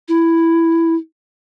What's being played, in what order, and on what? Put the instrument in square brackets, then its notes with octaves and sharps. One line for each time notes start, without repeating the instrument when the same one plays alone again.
[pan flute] E4